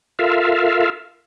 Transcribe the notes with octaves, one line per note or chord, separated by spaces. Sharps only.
F4 A4 A#4 E5 F5